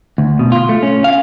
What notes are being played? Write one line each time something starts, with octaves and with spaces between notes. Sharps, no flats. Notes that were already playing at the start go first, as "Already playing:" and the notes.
D2
B2
F4
A3
C#4
F5